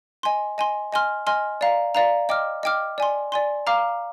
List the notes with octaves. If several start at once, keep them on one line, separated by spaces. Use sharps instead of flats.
D#5 G#5 C6
D#5 G#5 C6
D#5 G#5 C6 F6
D#5 G#5 C6 F6
D5 F5 A#5
D5 F5 A#5
D#5 G5 D6 F6
D#5 G5 D6 F6
D5 G#5 C6
D5 G#5 C6
F5 A#5 D6 F6